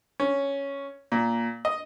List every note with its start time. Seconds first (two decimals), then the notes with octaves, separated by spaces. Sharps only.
0.20 C#4
1.12 A#2
1.65 D#5